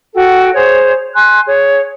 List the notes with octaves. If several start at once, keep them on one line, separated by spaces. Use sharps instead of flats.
F#4 A4 G5
G#4 C5 C#5
G#5 C6 F#6
G#4 C#5